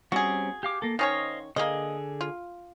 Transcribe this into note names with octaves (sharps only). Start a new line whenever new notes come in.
G3 C4 C#4 F#4 G#4
G4 F5 D6
A#3 A4
D#3 C#4 C5 C#5 D#5 F5
D3 A#3 G#4 D#5
F4